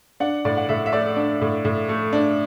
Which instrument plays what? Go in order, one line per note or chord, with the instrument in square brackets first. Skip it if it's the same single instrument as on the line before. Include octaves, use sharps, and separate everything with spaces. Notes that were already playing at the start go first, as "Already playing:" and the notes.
[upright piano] D4 F#5
A2 D5
F#5
A2 E5
E5
A3 D5
D4
A2
A2
A3
D4